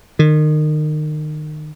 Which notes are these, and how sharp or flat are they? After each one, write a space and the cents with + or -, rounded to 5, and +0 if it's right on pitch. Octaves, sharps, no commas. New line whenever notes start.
D#3 -30